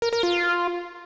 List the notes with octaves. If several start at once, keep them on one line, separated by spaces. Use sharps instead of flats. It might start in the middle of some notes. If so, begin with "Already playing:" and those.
A#4
A#4
F4